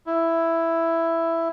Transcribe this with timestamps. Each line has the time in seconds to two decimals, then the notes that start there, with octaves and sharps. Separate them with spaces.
0.07 E4